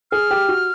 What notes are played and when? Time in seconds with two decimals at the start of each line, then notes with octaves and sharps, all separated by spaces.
0.11 G#4 F6
0.31 G4
0.49 F#4